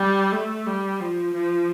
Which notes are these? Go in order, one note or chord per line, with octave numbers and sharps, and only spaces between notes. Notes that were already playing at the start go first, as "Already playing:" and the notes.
Already playing: G3
A3
G3
F3
F3